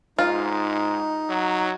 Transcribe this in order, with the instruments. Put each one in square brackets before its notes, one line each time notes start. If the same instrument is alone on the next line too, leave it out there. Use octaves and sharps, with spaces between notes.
[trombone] G#2 [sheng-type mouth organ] D#4 [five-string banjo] F4
[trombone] F#3